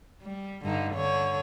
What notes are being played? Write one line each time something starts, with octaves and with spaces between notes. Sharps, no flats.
G3
G2 D3 D#4
D3 C#5